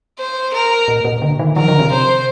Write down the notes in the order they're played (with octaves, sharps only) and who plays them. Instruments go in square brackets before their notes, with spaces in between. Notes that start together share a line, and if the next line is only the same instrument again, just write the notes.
[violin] C5
A#4
[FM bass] A#2
A#2
D3
D#3
[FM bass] F3 [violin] A#4
[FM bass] D3
C3
[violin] C5